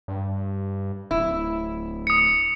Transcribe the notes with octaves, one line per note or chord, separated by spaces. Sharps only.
G2
D1 E4
D#6 C#7